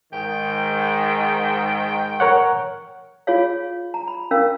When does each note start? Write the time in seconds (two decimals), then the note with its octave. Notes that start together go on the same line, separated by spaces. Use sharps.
0.13 G#2 D#3 G5
2.20 A#4 C#5 F#5
3.27 F4 G#4 C#5 F5
3.94 A#5
4.08 B5
4.31 C#4 A#4 F5